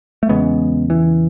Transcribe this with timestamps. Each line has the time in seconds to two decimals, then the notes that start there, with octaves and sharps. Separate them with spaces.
0.23 A3
0.29 E2 C#3 G#3 B3
0.90 E3